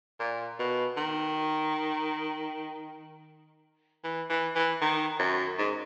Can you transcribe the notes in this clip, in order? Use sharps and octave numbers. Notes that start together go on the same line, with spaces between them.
A#2
B2
D#3
E3
E3
E3
D#3
F#2
G#2